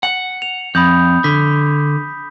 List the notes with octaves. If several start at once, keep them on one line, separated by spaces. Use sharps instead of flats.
F#5 C#7
F7
F2 B5 D#6 G6
D3 B6